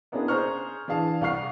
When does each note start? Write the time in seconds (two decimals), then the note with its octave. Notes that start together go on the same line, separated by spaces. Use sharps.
0.12 A#3 B3 C#4 D4 E4 G#4
0.28 G#4 C5 A#5 C#6 F6
0.88 E3 D4 G#4 F5 A5
1.21 C2 F5 F#5 C#6 F6 C7